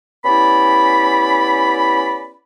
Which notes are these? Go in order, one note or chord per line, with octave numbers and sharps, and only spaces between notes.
B3 C#4 E4 G4 D5 B5